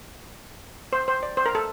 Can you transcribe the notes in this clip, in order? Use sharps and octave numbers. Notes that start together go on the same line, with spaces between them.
C5
C5
D5
C5
A#4
A4